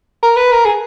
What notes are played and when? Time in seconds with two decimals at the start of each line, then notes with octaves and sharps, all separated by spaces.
0.23 A#4
0.36 B4
0.52 A#4
0.65 G#4